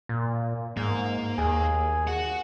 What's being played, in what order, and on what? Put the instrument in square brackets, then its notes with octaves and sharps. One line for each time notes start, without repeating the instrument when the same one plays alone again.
[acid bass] A#2
[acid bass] G#2 [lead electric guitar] A#3
[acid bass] D#2 [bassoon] G#4
[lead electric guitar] F#4 F#5